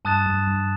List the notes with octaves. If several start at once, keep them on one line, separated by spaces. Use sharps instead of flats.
G2 A5 D#6 F#6 A6 E7
G2
G2